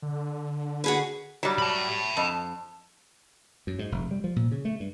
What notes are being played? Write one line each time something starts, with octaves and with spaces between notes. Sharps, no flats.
D3
F#4 G#4 B4
F#3 G3
A5 B5
F2
F#2
G#2
F1
G3
F3
A#2
C#3
A3
G2